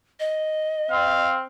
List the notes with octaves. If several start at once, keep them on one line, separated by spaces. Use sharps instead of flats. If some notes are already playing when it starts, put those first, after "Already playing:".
D#5
C4 F5